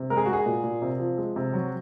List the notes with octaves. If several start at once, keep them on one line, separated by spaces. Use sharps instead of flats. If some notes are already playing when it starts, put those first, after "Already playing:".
Already playing: C3
G#3 A#4
G#4
G#3 F#4
G#4
A#2
A#2
C3
F3
G#3
C3
F#3